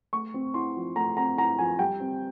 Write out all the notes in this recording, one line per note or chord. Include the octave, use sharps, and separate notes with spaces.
A3 C#6
C4
E4 C6
F3
A3 A#5
C4 A#5
E4 A#5
F3 G#5
G3 G5
C4